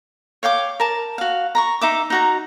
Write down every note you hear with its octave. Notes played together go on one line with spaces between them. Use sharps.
C#5 F5 G5 D6
A#4 A5
F#4 F5
A#5 B5 C#6
D#4 E5 D6
D#4 F#4 A#5